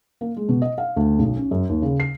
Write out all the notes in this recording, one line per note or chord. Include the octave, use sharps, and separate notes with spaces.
A#3
G#3
B2
D#5
F5
D2
B1
C#4
F#2
D#2
C#3
C7